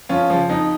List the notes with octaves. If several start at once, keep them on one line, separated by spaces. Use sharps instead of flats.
F2 C#4 F4
C#3 F3
F2 D#4